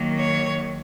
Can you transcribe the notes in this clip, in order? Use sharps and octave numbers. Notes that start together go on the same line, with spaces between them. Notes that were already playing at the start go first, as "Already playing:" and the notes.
Already playing: D#3 F#3 A#3
C#5